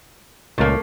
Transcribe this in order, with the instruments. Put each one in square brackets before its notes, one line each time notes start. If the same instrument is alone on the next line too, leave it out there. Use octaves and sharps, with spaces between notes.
[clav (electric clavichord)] C#2 A#2 [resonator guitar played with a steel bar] A3 A#3